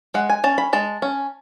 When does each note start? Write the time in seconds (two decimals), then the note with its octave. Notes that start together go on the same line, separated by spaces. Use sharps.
0.14 G#3 F#5
0.30 G#5
0.44 C#4 A5
0.58 B5
0.73 G#3 A5
1.02 C#4